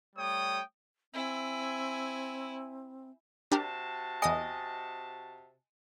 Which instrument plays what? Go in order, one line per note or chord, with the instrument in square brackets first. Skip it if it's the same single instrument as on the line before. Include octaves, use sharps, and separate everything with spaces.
[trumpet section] G3 A3 C#5 G5 D#6
[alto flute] C4 [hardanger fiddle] E4 G#5
[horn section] C3 F#4 A5 [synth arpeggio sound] D4 G4 A#4
[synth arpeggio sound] E2 D#6 C7 [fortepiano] D#5 [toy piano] G#5